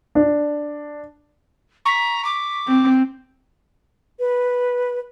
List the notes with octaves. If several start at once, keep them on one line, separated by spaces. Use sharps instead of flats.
D4
A#5 C#6 B6
D6
C4
B4